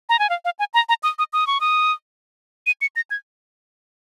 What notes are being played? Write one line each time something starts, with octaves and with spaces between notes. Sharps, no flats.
A#5
G#5
F5
F5
G#5
A#5
A#5
D#6
D#6
D#6
C#6
D#6
D#7
C#7
A#6
G#6